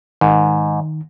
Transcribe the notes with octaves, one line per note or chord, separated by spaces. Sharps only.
G#2 D#3